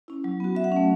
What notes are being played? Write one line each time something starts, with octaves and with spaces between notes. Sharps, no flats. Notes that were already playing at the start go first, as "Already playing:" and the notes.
C#4 E4
F#3
B3 F#4
F#3 E5
F#5
A3 C#4